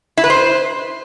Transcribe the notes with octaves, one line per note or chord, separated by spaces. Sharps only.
E4
B4
C5